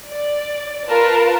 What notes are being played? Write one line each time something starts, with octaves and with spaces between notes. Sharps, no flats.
D5
F4 A#4 B4 A5